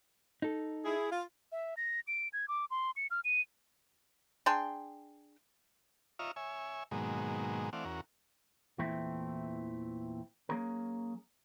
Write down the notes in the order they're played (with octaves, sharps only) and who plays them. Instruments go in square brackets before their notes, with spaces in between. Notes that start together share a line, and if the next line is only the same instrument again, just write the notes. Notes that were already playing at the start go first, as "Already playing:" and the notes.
[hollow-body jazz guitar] D#4 A4
[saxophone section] E4 G#4
F4
[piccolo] E5
A#6
D7
G#6
D6
C6
C#7
F6
D#7
[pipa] D4 G#4 G5 C6
[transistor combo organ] F4 C#5 D#5 E5 A#5 F6
C#5 E5 G#5
G#2 B2 D#3 F#3 G#3 A#3
E3 A3 C4 D5 F5 F#5
E2 C#4 F#4 A#4
[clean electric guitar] E2 A#2 E3 A3 C4 E4
F#3 G#3 A#3 C#4 G#4 A#4